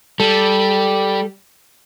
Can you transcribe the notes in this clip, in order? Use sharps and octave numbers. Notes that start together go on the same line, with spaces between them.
G3 A4